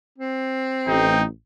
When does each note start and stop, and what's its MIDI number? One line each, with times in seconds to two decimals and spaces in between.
0.18 1.25 60
0.87 1.25 33
0.87 1.25 63
0.87 1.24 79